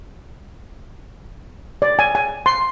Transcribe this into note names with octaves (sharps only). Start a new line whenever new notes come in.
D5
G#5
G#5
C6